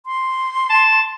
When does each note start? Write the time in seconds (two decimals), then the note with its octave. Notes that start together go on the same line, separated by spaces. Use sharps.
0.06 C6
0.70 A5